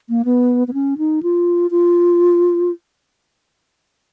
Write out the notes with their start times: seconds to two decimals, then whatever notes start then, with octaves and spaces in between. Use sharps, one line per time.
0.09 A#3
0.25 B3
0.68 B3
0.74 C#4
0.98 D#4
1.23 F4
1.71 F4